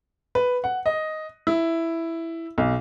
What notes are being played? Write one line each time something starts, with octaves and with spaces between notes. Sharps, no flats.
B4
F#5
D#5
E4
B1